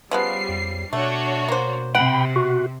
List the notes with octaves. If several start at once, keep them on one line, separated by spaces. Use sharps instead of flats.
C#3 F3 G3 B3 C7
F2
B2 A3 D4 F#4 C#5
A#3 C5
C3 F#5 G5 B5
B2 F#4